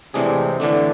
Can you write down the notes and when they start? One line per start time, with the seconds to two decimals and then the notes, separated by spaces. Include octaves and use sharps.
0.14 A2 C3 E3 G#3 D4 G#4
0.60 A2 D3 E3 A3 D4